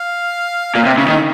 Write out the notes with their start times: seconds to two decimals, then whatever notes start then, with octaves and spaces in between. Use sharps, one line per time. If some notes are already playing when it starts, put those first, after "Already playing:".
Already playing: F5
0.75 A#2 F5
0.86 C3
0.97 C#3 E5
1.09 D#3